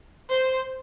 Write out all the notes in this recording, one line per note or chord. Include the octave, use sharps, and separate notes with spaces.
C5